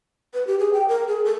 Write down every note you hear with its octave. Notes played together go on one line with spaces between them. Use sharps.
B4
G4
G#4
G5
A#4
G#4
A4